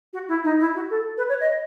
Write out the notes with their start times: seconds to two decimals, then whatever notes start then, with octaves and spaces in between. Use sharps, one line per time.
0.13 F#4
0.28 E4
0.44 D#4
0.60 E4
0.75 F#4
0.90 A4
1.17 B4
1.29 C#5
1.41 D#5